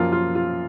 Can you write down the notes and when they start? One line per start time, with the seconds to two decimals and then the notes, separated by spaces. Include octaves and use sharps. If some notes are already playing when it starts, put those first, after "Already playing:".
Already playing: F#2 F3 A#3 F4
0.13 F4
0.35 F4